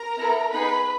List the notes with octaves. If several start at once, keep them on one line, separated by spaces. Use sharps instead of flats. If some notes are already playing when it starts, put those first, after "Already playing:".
Already playing: A#4 A#5
B3 E4 A4
B3 D#4 G#4 B4 B5